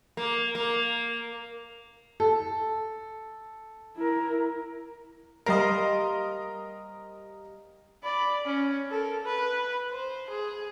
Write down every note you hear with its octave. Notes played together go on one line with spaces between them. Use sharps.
A#3
A#3
A4
E4 A#4
G3 A#4 C5 D#5 F5
D5 B5
C#4
A4 A#4
B4
C5
G#4